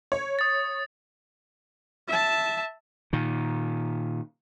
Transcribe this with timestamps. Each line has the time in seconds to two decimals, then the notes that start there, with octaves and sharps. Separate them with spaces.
0.12 C#5
0.39 D#6 A6
2.08 E5 A5
3.13 A#2 D#3